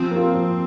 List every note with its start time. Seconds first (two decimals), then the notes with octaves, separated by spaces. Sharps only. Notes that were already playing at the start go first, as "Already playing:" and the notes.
Already playing: F3 C4
0.11 A#3
0.16 F4
0.33 F3